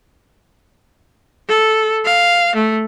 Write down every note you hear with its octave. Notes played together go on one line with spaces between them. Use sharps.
A4
F5
A3